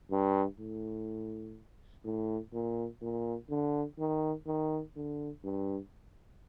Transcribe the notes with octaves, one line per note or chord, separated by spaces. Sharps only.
G2
A2
A2
A#2
A#2
D3
D#3
D#3
D3
G2